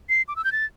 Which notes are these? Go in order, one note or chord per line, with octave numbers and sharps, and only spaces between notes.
C7
D6
E6
G6
A6